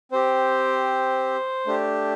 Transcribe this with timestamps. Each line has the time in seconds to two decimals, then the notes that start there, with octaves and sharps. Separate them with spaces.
0.12 C4 G4 C5
1.67 A3 D4 G4